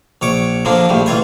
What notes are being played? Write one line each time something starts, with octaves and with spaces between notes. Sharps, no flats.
A#1 C#5 D6
D3 F3 A#3 D4
A#1 A2 G3
A1 E3 F4 G#5